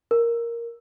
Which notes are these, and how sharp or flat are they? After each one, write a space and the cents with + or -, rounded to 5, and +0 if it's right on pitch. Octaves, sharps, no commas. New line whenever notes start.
A#4 +0